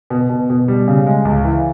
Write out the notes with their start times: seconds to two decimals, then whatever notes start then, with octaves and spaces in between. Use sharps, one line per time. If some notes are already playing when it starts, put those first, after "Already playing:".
0.10 B2
0.29 B2
0.50 B2
0.68 G3
0.87 C#3
1.06 G#3
1.25 C#2
1.45 E3